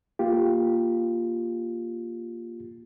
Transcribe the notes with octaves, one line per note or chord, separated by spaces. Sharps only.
A#3 F4 G4